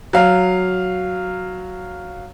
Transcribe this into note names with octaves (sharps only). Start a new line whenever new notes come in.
F#3 F5